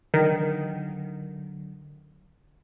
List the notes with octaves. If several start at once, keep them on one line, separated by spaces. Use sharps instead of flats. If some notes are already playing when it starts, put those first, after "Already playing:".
D3 D#3 F#3